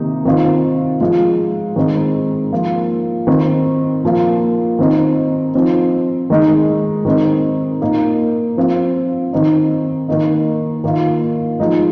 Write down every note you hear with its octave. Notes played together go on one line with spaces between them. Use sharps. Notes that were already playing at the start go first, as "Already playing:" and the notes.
Already playing: C3 D#3 A#3 D#4
D#3 C4 F4
F3 G#3 F4
D#3 G#3 C4 D#4
F3 A#3 F4
D#3 C4 D#4
A#2 F3 A#3 F4
D#3 C4 D#4
F3 C4 D#4
D#3 G#3 D#4
D#3 C4 D#4
A#2 A#3 D#4
F3 C4 F4
D#3 C4 D#4
D#3 A#3 D#4
D#3 A#3 F4
F3 G#3 D#4